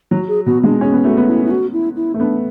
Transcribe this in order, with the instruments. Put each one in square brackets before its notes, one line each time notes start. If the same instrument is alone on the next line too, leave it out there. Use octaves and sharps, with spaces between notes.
[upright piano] F#3 [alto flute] F#4
[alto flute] G#4
[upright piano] B2 [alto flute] F#4
[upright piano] G#3 [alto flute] D4
[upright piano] C#4 [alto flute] G#4
[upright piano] B3
[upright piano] A3 [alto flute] F#4
[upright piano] B3
[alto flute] E4
E4
F#4
E4
E4
[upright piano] A3
[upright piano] B3 [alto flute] D4